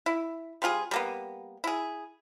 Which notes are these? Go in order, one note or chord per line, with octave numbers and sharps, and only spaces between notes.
E4
G3 C4 F4 G#4
G3 A#3 B3
E4 G#4